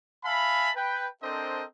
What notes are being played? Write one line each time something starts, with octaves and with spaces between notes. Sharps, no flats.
E5 F5 G#5 A5 B5
B4 G5
C4 D4 A4 A#4 C5 D#5